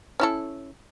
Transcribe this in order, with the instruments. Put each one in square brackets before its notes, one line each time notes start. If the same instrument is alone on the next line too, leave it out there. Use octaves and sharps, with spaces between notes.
[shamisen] C#4 E4 A4